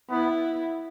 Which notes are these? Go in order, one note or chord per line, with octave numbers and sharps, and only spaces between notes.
B3 E4